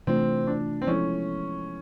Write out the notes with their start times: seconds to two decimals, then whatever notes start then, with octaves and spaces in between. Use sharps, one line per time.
0.07 C3 E3 A3 C4 D4 F4
0.47 D4
0.82 C4
0.87 F3 G#3 B3 C#4 E4 A4